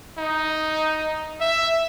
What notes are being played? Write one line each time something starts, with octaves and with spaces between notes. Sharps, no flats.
D#4
E5